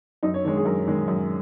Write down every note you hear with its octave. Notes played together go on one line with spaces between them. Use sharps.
F#2 D#4
C#5
D#3 G#3 C#5
G#4
F#2 A#4
D#3 G#3
F#2